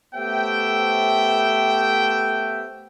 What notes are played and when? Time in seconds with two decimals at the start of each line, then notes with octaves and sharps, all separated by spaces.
0.14 A3 B3 G4 C5 E5 G5